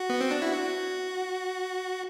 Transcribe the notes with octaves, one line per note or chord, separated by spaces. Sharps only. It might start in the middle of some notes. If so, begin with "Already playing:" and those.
Already playing: F#4
B3
C4
D4
E4
F#4